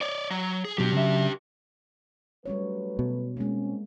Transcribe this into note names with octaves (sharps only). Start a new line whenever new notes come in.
C#5 D5
F#3
G#4
B2 F#3 D4 G4
C#3 F#3 E5
F#3 G3 A3 C#4 B4 C#5
B2
G#3 A#3 C4 C#4